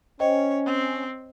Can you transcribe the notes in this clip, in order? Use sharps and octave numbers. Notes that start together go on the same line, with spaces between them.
C#4 C5 C#5 D#5 G5
C4